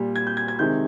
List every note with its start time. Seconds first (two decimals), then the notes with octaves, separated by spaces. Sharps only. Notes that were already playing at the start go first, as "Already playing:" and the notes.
Already playing: A#2 G3
0.16 G#6
0.27 G6
0.37 G#6
0.48 G#6
0.59 C3 D#3 G#3 G6